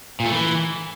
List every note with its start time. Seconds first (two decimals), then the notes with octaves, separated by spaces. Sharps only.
0.20 A#2
0.26 A3
0.32 E3